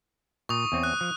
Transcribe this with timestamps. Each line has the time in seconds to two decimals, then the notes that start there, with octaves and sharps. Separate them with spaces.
0.49 A#2 C#6 D#6
0.72 E2 C4 C#5
0.83 F#6
1.01 F3